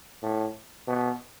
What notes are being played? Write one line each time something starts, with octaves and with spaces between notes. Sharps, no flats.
A2
B2